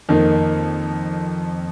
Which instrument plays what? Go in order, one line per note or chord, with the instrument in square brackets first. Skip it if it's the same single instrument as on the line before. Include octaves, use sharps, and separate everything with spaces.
[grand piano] F2 D#3 A#3 D#4